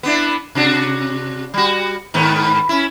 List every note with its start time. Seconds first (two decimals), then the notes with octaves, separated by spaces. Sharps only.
0.03 B3 D4 E4
0.55 C3 D4 F#4
1.54 G3 F#4
2.14 G#2 D#3 B3
2.69 C#4 E4